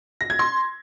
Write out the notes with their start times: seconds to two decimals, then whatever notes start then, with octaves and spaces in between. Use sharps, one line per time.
0.21 A#6
0.30 G#6
0.39 C6